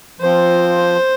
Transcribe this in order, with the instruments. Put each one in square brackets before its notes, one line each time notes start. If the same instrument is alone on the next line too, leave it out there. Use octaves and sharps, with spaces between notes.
[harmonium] F3 C4 F4 [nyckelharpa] C5